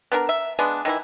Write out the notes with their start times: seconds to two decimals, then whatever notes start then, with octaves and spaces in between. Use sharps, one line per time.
0.11 B3 D4 A#4
0.29 E5
0.59 G#3 B3 D4
0.85 D#3 E3 D4 E4